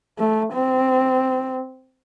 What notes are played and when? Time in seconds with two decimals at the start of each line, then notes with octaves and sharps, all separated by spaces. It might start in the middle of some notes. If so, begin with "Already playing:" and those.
0.19 A3
0.53 C4